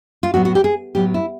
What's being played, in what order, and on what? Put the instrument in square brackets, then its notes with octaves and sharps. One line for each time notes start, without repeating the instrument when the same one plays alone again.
[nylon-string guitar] F4
A2 F#3 B3 F#4
F#4
G4
G#4
A2 F#3 B3 G4
E4